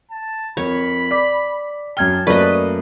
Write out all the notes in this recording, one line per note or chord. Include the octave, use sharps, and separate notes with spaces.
A5
F2 A#4 C#5 B5
D5 D6 B6
F#2 G5 A5 F6 G#6 G7
F#2 A3 A#3 B4 D5 D#5 C#6